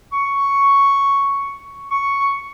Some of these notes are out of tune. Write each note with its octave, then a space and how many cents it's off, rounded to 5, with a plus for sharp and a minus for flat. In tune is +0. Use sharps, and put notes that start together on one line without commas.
C#6 +5
C#6 +5